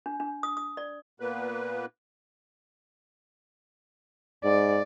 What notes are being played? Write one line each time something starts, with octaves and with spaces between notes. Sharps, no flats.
D4
D4
D#6
D#6
D5
A#2 A#3 B3 B4
G#2 D5